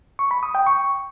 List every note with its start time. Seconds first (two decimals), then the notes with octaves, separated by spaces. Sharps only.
0.19 C#6
0.31 B5
0.43 D#6
0.55 G5
0.66 C#6